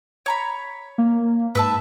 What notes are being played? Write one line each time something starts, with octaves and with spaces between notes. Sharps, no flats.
C#5 A#5 B5
A#3
G#2 B4 E5 A5